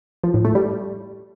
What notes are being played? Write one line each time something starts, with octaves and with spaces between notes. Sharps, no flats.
F3
A2
A3
G3